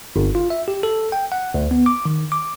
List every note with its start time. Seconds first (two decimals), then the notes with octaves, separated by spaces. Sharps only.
0.16 G1
0.35 F4
0.50 E5
0.68 G4
0.83 A4
1.12 G5
1.32 F#5
1.54 D2
1.71 B3
1.86 D6
2.05 D#3
2.32 D6